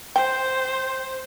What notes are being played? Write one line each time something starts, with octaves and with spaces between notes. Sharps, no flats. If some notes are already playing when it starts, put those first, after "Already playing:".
C5 G5